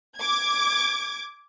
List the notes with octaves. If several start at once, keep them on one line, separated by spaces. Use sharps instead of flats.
D6 G#6